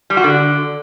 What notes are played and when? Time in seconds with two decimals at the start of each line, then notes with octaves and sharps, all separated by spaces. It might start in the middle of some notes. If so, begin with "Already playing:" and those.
0.10 G3
0.17 F#4
0.24 D3